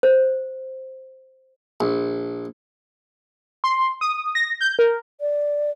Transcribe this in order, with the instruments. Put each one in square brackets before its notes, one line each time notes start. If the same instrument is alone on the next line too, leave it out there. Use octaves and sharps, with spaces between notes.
[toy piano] C5
[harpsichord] A#1
[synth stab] C6
D#6
A#6
G6
A#4
[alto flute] D5